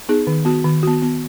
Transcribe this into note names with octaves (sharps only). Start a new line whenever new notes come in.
B3 D#4 G#4
D#3
B3 F#4
D#3
B3 F#4
B3